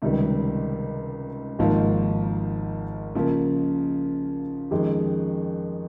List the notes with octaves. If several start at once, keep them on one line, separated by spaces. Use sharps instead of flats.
C#2 C3 D#3 G3
G#1 G#2 F3 A#3 F4
C#3 F3 A#3
F2 D#3 G#3 C#4 G4